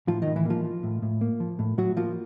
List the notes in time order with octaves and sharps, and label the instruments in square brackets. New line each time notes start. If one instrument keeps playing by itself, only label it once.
[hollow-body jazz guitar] A2 F3 F4
A2 D#3 D#4
E3 E4
F3 A#3 F4
F3
A2
A2
A#3
F3
A2
A2 F#3 F#4
F3 A#3 F4